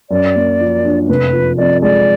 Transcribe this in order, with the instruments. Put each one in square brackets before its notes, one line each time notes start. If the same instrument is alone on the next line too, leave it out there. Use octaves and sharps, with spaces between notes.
[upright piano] F#2 [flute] D5
[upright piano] A#3
F3
D4
[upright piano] F1 [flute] B4
[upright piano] F3
[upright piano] F2 [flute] D5
[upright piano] G#3 [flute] D5